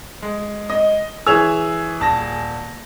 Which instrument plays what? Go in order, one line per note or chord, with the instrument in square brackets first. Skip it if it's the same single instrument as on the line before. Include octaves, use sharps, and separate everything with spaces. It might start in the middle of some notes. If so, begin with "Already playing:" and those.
[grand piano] G#3
[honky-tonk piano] D#5
[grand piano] E3 C#5 E6 [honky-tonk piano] G#4 G#6 F7
[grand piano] D#1 A5 A#6